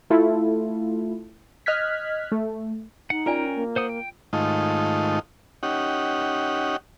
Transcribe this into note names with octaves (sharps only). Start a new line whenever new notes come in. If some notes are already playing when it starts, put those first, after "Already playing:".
A3 E4 F4 A4
D#5 F6 F#6 G#6 B6
A3
D#4 F#5
C#4 F4 A#4 D5 G5 G#5
A#3
C5 F#5 D#6
G5
G#2 D#3 A3 D#4 F4
C#4 D#4 G4 F#5